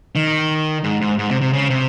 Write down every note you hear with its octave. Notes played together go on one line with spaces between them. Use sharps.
D#3
G#2
G#2
G#2
C3
C3
C#3
C3